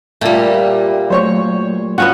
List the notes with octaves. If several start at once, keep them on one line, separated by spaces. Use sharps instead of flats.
A#2 G3 A3 F4 E5
F#3 A3 A#3 C5 C#5 C#6
B3 C#4 F4 F#4 F#5